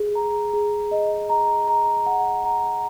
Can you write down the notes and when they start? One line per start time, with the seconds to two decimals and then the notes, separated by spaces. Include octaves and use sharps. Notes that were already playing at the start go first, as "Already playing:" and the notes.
Already playing: G#4
0.15 A#5
0.53 G#4
0.91 D#5
1.30 A#5
1.68 A#5
2.06 F#5
2.44 A#5